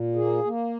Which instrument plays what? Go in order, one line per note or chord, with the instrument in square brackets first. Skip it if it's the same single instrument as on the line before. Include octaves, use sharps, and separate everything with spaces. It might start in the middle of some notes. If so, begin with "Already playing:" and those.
Already playing: [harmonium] A#2
A#3 G#4
A#3